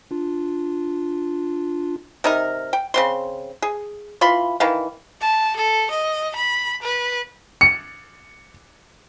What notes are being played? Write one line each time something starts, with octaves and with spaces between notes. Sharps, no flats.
D4 F4
C3 D#4 A#4
G5
C#3 C4 C6
G#4
E3 F4 B5 C6
D#3 E3 F5
A5
A4
D#5
B5
B4
C#7